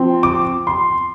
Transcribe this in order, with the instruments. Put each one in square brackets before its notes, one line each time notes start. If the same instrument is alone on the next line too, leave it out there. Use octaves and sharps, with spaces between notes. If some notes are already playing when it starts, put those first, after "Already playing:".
Already playing: [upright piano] F3 C4
D6
C6